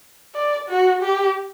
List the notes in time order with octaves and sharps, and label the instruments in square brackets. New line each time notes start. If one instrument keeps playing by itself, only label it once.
[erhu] D5
F#4
G4